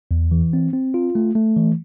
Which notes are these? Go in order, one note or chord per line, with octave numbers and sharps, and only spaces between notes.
E2
E3
C4
C4
F4
A3
A3
E3